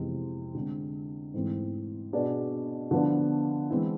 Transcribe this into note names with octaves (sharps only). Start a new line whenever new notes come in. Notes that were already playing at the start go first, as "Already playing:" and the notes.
Already playing: F2 C3 E3 G#3 C4
D3 G#3 C4
G#2 E3 A3 C4
B2 B3 D4 G#4 D5
D3 F3 B3 D4
E3 G#3 C4 E4